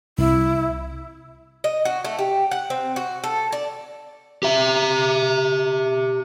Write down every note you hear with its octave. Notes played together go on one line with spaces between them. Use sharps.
C2 E4
D#5
F#4
A3
G4
F#5
C4
F#4
A4
D5
G4 E5